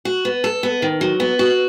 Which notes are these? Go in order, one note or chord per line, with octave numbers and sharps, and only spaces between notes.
F#4
B3
A4
B3
D#3
F#3
B3
F#4